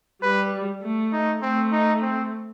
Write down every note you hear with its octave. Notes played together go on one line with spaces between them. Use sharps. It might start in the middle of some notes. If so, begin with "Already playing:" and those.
G3 B4
A3
D#4
A3 C4
D#4
C4